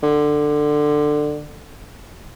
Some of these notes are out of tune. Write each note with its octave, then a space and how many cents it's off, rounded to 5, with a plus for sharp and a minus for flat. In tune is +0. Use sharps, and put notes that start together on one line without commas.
D3 +15